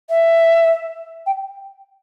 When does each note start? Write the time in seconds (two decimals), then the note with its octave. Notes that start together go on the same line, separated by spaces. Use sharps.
0.09 E5
1.26 G5